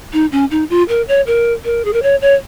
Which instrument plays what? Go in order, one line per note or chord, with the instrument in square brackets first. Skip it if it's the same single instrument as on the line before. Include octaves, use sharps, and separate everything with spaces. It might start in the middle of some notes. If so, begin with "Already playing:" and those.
[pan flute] D#4
C#4
D#4
F4
A#4
C#5
A#4
A#4
G#4
A#4
C#5
C#5